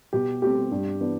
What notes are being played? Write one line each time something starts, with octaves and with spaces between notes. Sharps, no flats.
B2 G4
A3 C4 G4
G2
E3 B3 D4